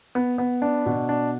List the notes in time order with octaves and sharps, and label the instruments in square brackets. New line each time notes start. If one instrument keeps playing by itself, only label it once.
[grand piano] B3
B3
D4
B2
D4